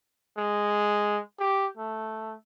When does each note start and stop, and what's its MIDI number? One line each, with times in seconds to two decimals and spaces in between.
0.37 1.20 56
1.40 1.66 67
1.77 2.35 57